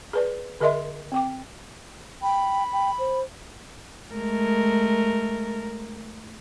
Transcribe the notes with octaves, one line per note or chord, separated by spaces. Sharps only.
G#4 B4 D5
D3 G#4 A#4 D#5 E5 C6
C4 G5 D6
G5 B5
G5
C5
G#3 A3 A#4